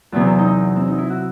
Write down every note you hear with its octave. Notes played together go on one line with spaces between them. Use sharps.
E2 C3 F#3 B3
C4
D#4
C4
D#4
E4
F#4